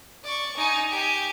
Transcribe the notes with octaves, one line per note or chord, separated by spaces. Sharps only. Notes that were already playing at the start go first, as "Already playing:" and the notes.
D5 C#6
D#4 G#5
G4 G#5